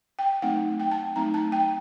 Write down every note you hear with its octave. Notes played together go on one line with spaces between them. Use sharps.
G5
F#3 A3 C4 D#4 F#5
G5
A5
F#3 A3 C4 D#4 A#5
A5
G5